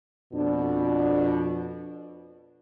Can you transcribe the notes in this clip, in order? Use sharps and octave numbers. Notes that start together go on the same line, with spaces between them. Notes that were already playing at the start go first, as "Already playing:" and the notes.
F2 B2 D4